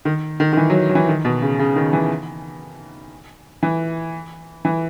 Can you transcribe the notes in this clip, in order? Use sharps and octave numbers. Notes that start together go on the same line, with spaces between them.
D#3
D#3
D#3
E3
F#3
F#3
E3
D#3
B2
C#3
C#3
D#3
E3
E3
E3